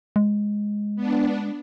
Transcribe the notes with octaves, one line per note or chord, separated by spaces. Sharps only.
G#3
B3 D4